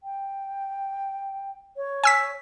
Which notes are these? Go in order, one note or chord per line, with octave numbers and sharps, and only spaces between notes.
G5
C#5
G#5 E6 B6